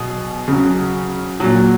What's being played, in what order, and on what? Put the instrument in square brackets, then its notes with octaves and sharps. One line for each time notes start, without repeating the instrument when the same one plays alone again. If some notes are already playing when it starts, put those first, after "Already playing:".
Already playing: [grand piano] B2 F#3 G#4
C#3 F#3
A#2 F#3